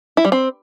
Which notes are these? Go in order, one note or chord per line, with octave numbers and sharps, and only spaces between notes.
E4
G3
C4